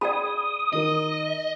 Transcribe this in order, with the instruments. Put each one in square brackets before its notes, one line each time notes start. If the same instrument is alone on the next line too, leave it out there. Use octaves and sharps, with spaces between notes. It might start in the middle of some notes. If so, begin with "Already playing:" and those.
[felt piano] G#4 [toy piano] D5 G5 B5 [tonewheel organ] D#6
[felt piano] D#3 A#4 [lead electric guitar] D#5